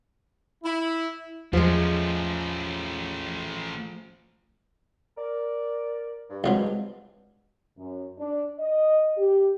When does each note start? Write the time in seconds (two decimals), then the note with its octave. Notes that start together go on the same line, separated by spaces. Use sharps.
0.63 E4
1.53 E2 F3 G#3 A3 C#4
5.17 A#4 D5
6.29 G2
6.44 C2 F3 F#3 G#3
7.78 F#2
8.19 D4
8.60 D#5
9.18 G4